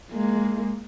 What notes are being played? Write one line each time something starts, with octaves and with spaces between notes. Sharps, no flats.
G#3 A#3